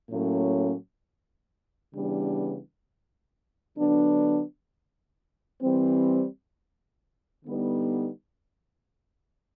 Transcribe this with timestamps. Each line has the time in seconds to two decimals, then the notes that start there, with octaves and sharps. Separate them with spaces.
0.11 A2 F#3 A#3 C#4
1.94 C#3 E3 G3 B3 D4
3.77 D3 F#3 B3 D4
5.61 E3 G3 C4
7.45 D3 G3 B3 D#4